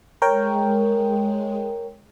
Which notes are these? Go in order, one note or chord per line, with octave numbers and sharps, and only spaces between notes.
G#3 A#4 C#5 G5